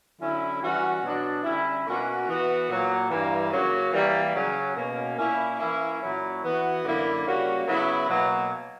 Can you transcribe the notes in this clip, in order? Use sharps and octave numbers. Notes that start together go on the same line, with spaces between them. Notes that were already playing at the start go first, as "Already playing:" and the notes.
D3 F#3 C#4 E4
E3 G3 C#4 F#4
B2 F#3 B3 D4 F#4
D3 G3 C#4 E4
B2 A#3 C#4 F#4
E3 B3 F#4
A#2 F#3 A#3
G2 E3 A#3
C#3 F#3 A#3 C#4 F#4
E3 G3 A#3
C#3 F#3 C#4
B2 A#3 C#4
A#2 A#3 C#4 E4
E3 A#3 C#4 E4
A#2 F#3 C#4 E4
E3 B3 F#4
F#2 D3 A#3 E4
C#3 G3 A#3 C#4 F#4
C#3 F#3 B3 E4
B2 F#3 A#3